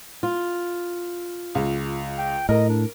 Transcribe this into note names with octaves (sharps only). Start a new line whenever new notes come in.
F4
C#2
G5
A2 A#4 D#5
D4